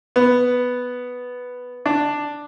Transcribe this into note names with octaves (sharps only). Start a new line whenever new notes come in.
B3
D4